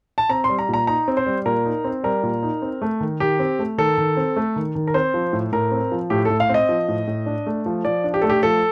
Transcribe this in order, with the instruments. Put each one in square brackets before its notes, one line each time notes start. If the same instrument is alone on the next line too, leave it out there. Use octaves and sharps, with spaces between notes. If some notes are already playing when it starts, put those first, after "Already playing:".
[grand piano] A5
C4 A#5
G3 C6
A#5
A#2 A#5
D#4 A#5
C4
C5
G3
A#2 A#4
D#4
C4
G3 A#4
A#2
D#4
C4
A3
D#3
D#3 G4
C4
A3
D#3 A4
D#3
C4
A3
D#3
D#3
A#4
C4 C5
F3
A2
A2 A#4
C4
F3
A2 G4
A2 A4
F5
C4 D#5
F3
A2
A2
D4
A3
F3
F3 D5
D4
G4
A3 A4
G4
F3 A4